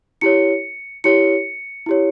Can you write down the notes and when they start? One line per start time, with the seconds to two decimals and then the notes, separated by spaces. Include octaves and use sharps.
0.21 E4 G4 C#5 C#7
1.04 E4 G4 C#5 C#7
1.86 E4 G4 C#5